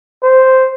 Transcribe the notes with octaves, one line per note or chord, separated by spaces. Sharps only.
C5